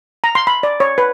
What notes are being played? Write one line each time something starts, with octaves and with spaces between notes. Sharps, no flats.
A#5
C6
B5
D5
C#5
B4